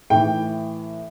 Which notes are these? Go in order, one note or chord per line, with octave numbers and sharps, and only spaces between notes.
A2 E3 G5